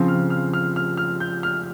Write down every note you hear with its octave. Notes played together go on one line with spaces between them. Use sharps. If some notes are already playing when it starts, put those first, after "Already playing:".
Already playing: C#3 F3 C4
F6
F6
F6
F6
F6
G6
F6